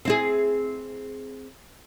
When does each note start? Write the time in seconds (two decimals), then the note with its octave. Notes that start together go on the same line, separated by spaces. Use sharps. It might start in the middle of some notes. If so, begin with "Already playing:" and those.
0.05 C4 E4 G#4